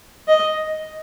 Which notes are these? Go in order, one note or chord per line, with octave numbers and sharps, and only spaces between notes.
D#5